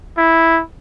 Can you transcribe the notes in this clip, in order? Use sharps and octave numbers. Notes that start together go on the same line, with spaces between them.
E4